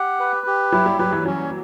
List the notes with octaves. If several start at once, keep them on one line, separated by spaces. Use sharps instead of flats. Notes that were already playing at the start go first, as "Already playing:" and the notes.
Already playing: G4 F#5
B4
G4
F#3 E4
G3
F#3 B4
E3
F#3 C#4